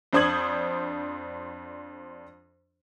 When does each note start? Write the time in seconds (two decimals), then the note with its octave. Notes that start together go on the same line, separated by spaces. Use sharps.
0.13 F2 D4 C5 D#6 G#6 F#7